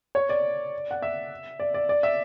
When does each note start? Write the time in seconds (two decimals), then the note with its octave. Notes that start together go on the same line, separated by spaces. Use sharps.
0.15 C#5
0.29 D5
0.91 F#5
1.02 E5
1.60 D5
1.74 D5
1.89 D5
2.03 E5